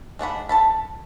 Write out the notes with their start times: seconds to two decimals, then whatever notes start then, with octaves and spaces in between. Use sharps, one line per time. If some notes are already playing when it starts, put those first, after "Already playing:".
0.19 G#3 D4 F#5 B5
0.49 A4 A5 B5